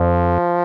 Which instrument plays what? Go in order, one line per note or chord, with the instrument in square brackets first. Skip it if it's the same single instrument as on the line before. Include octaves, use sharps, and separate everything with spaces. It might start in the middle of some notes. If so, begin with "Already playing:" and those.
Already playing: [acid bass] F2 [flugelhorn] F3